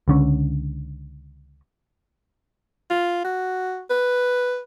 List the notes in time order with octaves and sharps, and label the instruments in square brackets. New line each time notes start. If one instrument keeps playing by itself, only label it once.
[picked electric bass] C#2 D3 C#4
[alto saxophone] F4
F#4
B4